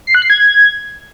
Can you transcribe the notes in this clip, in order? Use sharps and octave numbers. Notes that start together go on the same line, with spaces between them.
C7
F#6
C7
G#6